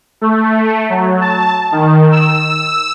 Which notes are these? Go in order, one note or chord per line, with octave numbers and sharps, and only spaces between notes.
A3
F#3
A5
D#3
E6